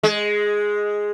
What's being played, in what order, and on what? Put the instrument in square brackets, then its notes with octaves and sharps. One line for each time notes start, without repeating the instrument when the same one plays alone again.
[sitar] G#3